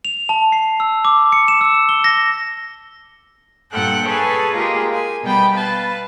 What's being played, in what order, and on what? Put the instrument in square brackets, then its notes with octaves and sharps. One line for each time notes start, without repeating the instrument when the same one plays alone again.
[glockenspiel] F7
A5
C7
E6
D6
C#7
E7
E6
G7
A#6
[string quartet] G2 A#2 A4 F#5 G5 F#6
G#4 A4 B4 C#5 G#5 A5
G#3 A#3 F4 G4 G#4 A#4
G#5
B2 G3 B3 G5 A5 B5
B4 F5 A5